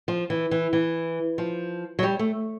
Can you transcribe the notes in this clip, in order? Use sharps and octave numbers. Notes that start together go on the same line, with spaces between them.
F3
E3
E3
E3
F3
F#3
G3
A3